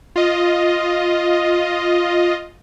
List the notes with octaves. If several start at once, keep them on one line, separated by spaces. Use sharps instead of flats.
F4 D#5